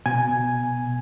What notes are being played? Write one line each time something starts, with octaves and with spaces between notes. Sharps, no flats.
B2 G#5